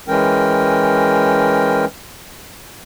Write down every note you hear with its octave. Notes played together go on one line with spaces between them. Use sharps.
E3 G#3 C#4 A#4 G5